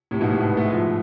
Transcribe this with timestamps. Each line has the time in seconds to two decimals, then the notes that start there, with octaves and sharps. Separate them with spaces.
0.11 A2 C3
0.21 G#2 B2
0.31 A2 C3
0.40 G#2 B2
0.50 B3
0.57 A3
0.65 G#3
0.72 F3 A3